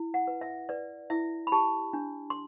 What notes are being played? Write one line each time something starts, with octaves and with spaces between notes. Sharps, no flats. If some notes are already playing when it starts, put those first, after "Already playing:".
Already playing: E4
F#5
B4
E5
B4 D5
E4 E5
B5
G4 A5
D4
C6